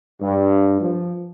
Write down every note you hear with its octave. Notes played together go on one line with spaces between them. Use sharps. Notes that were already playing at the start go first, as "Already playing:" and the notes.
G2
F3